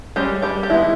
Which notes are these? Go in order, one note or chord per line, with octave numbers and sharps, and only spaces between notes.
G3 G#3 C#4 G4
G3 G4
G4
D#3 G#3 B3 E4